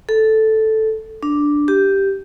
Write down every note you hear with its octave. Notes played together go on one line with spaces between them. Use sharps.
A4
D4
G4